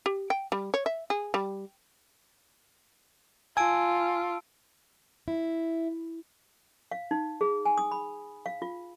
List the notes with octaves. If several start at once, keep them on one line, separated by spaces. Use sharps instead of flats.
G4
G5
G3
C#5
E5
G#4
G3
F4 G#5 A5 E6 D7
E4
F5
D#4
G#4
G#5
D#6
B5
F5
F4